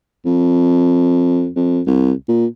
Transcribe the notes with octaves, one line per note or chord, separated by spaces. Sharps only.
F2
F2
C2
A#2